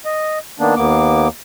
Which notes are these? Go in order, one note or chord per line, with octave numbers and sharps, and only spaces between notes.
D#5
D#3 A#3 B3 D4
D#2 A#3 B3 D6